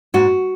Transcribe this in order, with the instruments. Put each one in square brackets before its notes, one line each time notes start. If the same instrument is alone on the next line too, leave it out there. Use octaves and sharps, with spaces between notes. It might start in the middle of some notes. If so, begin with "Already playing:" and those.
[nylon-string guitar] G#2 F#4